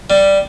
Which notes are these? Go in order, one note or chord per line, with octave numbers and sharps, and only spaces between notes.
G3